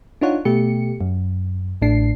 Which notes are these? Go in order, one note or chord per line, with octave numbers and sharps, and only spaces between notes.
D4 D#4 F4 C#5 F#5
B2 A3 G4 C#7
F#2
A1 A2 D4 C7